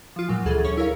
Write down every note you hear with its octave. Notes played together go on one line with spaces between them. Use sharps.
F3 F4
A#2 F#3 G#3
D2 E3 G#4 A4
C#4 C#5
E4 A#4 C#5 F5